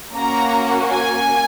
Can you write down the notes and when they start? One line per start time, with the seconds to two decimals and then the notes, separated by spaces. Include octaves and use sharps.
0.13 A#3 C#4 F#4 A#5
0.90 G#5